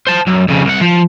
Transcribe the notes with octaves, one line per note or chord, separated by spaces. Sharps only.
C5 A5
F#2
F2 C#3
C2 F#5
F3